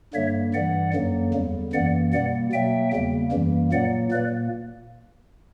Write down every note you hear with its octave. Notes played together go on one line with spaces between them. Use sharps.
G2 D3 G3 A#3 C#5 E5
G2 E3 G3 D5 F#5
F#2 D3 F#3 A#3
E2 D3 G3
F#2 E3 A#3 D5 F#5
B2 G3 A#3 D5 F#5
B2 F#3 A#3 E5 G5
E2 C#3 G3 A#3
F#2 E3 G3 A#3
A#2 F#3 A#3 D5 F#5
A#2 A#3 B4 D5